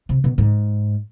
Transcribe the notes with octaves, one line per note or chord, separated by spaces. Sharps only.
C3
B2
G#2